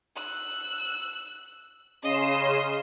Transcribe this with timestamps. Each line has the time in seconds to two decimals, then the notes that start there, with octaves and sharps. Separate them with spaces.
0.17 E6 F#6
2.03 C#3 D#5 C6 E7